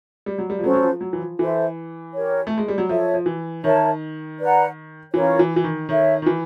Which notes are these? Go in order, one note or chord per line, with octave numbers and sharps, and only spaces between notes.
G3
F#3
G3
F3
F#3 C#4 F#4 A4 C5
F#3
F3
F#3
E3
F3
E3 A4 C5 E5
G4 A#4 C#5
A3
G#3
G3
F#3
F3 A4 C#5 E5
F3
E3
D#3 A#4 C#5 E5 A5
B4 D5 F#5 A#5
E3 C#4 F4 A#4 C#5
E3
E3
D#3
D#3 A4 C#5 E5
D#3
E3